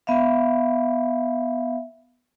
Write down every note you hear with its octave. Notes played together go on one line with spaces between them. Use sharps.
B3 E5 F5